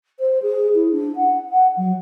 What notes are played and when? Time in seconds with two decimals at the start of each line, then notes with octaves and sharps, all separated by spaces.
0.20 C5
0.42 G#4
0.75 E4
0.92 D4
1.16 F#5
1.49 F#5
1.77 F#3